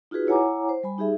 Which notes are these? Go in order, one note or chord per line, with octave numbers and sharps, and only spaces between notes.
D#4 F4 F#4 G#4 B4
E4 C#5 F#5 G#5 A#5 D6
C5
G3 G#5 B5
D#4 G4 G#4 E5